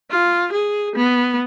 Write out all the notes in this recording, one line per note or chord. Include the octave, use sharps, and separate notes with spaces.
F4
G#4
B3